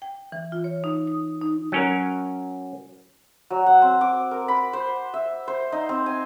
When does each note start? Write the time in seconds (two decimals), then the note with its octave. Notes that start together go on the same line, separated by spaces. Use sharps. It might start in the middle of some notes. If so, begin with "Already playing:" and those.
0.02 G5
0.32 E3
0.52 F4
0.64 C#5
0.84 D#4
1.07 D#6
1.42 D#4
1.72 F#3 C#4 A#4
3.50 F#3
3.66 F#5
3.82 C4
4.01 D6
4.31 A#4
4.48 B5
4.73 C5
5.14 E5
5.48 C5
5.72 D#4
5.89 C4
6.06 G#5